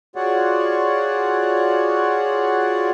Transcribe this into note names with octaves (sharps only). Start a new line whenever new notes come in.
F4 F#4 G#4 C#5 D5 F#5